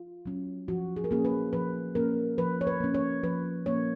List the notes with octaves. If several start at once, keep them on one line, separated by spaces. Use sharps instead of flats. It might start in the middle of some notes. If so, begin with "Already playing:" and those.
Already playing: F4
F#3 C#4
F3 F#4
G#4
A#4
A#3 C#4 G#4
B4
F3 B4
A#3 C#4 A#4
F3 B4
C#5
B4
A#3 C#4
C#5
F3 B4
A#3 C#4 C#5